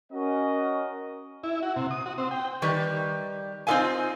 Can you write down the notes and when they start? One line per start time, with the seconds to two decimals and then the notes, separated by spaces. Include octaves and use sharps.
0.13 C#4 F#4 A#4 D#5
1.44 E4
1.63 F#4
1.76 C3
1.91 D#6
2.06 F#4
2.18 C4
2.31 G5
2.62 D#3 G3 B4
3.67 C4 D#4 F4 A4 F5 G#5